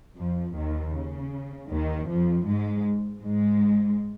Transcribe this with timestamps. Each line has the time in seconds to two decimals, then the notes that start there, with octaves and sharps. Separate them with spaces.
0.18 F2 F3
0.56 D#2 D#3
0.95 C#3
1.70 D#2 D#3
2.09 F2 F3
2.47 G#2 G#3
3.23 G#2 G#3